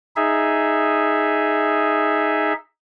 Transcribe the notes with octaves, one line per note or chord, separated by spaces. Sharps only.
D#4 G#4 E5